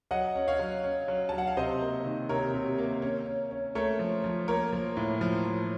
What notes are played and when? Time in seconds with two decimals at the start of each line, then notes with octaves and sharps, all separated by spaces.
0.11 F#3 D#5 F#5
0.35 C#4
0.48 C#5 F5
0.59 F#3
0.84 C#4
1.08 F#3
1.29 F#3 A5
1.38 F#5
1.47 F5
1.57 C3 C5 D#5
1.81 A#3
2.05 D#3
2.29 C3 A#4 C#5
2.54 C3
2.78 A#3
3.02 C#4
3.27 C#4
3.51 C#4
3.75 A3 A#4 C#5
3.99 F3
4.24 F3
4.48 A#3 A#4 C#5
4.72 F3
4.97 A2
5.21 F3
5.45 F3